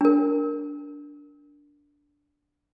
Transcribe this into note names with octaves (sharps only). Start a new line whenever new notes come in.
D4 A#4